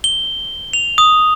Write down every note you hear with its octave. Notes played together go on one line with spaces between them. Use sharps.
G7
F7
D#6